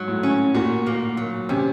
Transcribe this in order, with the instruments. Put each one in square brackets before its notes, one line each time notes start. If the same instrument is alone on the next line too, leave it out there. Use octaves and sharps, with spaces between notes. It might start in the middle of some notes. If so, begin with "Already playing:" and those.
Already playing: [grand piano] G#2 [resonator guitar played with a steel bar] F#3
[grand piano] A2
[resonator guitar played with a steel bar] C#4
[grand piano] A#2 [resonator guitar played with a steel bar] F#4
[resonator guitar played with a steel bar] A#3
F#3
[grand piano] C3 [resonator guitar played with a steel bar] C#4